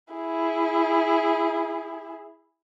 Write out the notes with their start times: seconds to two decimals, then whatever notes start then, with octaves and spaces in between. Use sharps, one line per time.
0.13 E4 G#4